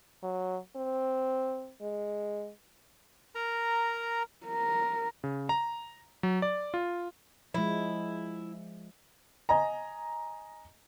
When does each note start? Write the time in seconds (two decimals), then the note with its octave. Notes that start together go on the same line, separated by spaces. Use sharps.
0.23 F#3
0.76 C4
1.81 G#3
3.35 A#4 A#5
4.46 A#4
5.24 C#3
5.49 A#5
6.23 F#3
6.42 D5
6.74 F4
7.54 F3 G#3 E4
9.49 D#5 G#5 A#5